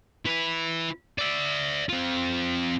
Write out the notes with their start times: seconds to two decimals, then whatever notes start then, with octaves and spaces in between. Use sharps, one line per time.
0.26 E4 B4
1.18 D5 E5
1.89 C4 F4